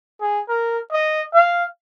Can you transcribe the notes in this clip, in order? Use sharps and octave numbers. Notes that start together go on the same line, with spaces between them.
G#4
A#4
D#5
F5